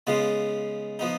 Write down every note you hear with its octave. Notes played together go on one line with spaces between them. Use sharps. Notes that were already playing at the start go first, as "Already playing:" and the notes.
C#3 G#3 B3 F4
F3 B3 D#4